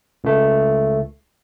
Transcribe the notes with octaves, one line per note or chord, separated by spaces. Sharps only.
C#2 A3